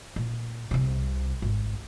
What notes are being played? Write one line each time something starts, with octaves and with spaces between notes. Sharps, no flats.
A#2
C2 C3
G#1